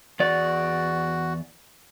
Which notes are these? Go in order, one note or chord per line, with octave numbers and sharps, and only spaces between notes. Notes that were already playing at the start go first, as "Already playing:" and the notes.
E2 F#4 D5